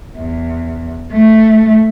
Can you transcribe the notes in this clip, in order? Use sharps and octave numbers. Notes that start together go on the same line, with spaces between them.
E2
A3